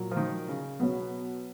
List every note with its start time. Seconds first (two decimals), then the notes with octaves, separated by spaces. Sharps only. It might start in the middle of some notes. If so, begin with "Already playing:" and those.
Already playing: A#2 F#3 A#3
0.11 F3
0.17 D#3
0.48 C#3
0.80 B2 F#3 B3 F#4 C#5